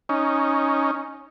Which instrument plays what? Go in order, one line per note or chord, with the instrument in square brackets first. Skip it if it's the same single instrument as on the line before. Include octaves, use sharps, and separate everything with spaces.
[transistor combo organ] C#4 D#4